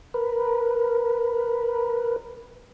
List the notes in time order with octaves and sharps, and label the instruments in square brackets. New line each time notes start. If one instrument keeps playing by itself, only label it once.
[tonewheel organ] A#4 B4